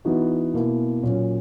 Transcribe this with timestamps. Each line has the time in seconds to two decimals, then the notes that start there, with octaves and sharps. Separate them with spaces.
0.05 E3 B3 D#4 F#4
0.54 B2 A#3 E4
1.03 A#2 F#3 C#4